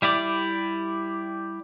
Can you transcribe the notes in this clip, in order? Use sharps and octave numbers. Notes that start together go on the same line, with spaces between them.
G3 E4 G4 D5